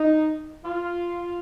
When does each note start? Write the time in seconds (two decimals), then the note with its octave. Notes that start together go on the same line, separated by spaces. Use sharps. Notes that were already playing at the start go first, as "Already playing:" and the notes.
Already playing: D#4
0.65 F4